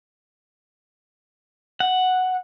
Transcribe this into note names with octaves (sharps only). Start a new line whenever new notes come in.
F#5